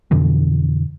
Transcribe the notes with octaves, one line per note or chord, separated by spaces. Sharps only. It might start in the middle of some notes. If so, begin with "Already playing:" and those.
F2 B2 D3 E3